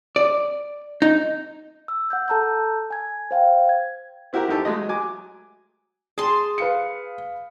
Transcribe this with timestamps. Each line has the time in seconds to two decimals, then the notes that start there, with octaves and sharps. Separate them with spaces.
0.16 D5
1.02 D#4
1.88 E6
2.10 F#5 F#6 G6
2.28 A4 A5 A#5 E6 G6
2.90 G#5 G#6
3.31 C5 F5 G5
3.69 G#6
4.33 C4 E4 F#4 G4 A#4
4.48 F#2 D#4 G4 A4
4.65 F#3 G#3 A3 D#5
4.89 F#3 G#5 D6
6.18 G#4 A5 C6
6.58 B4 F5 C#7